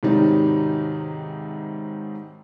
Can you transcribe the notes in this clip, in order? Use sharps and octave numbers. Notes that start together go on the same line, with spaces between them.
G#2 C3 D#3 F#3 G3 D#4